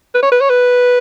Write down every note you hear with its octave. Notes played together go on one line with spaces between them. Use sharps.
B4
C#5
B4
C#5
B4